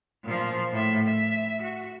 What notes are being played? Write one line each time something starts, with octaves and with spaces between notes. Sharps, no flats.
A#2 F3
A2 E5
E5
F#4